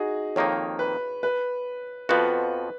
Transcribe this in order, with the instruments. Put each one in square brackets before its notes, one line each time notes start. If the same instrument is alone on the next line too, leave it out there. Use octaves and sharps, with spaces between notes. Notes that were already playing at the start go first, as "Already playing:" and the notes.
Already playing: [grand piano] D#4 F#4 G#4
[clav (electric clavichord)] F2 D#3 A#3 D#4 [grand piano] C#5
[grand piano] B4
B4
[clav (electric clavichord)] F2 F3 B3 F#4 [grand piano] B4